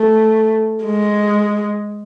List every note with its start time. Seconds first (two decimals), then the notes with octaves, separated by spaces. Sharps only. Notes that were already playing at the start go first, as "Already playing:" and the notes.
Already playing: A3
0.84 G#3